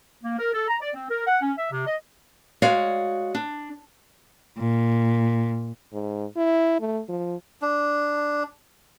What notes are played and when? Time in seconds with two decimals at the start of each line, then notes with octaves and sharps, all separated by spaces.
0.24 A#3
0.39 A#4
0.54 A4
0.68 A#5
0.82 D5
0.94 C4
1.11 A#4
1.27 F#5
1.42 C#4
1.58 E5
1.71 C3
1.87 D#5
2.62 G#3 F#4 C#5 D5 F5
3.35 D4
4.58 A#2
5.92 G#2
6.36 E4
6.80 A3
7.09 F3
7.62 D4